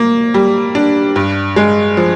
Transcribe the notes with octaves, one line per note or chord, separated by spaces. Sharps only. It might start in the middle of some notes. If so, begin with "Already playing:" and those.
Already playing: A#3
G3
D4
G2
G#3
F3